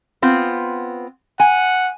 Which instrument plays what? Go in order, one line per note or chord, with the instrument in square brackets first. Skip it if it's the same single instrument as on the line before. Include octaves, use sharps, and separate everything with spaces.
[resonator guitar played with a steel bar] B3 C4 F4
[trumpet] F#5 [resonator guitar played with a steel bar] G#5